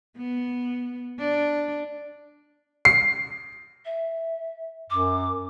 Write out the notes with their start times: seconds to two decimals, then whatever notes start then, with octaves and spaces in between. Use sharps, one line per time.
0.17 B3
1.19 D4
2.85 C7
3.85 E5
4.90 F#2 D6